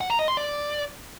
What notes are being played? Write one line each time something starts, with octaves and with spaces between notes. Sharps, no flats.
F#5
A#5
D#5
C6
D5